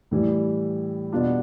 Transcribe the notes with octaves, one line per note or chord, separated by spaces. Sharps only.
A2 E3 G3
B2 G3 B3 D4 F4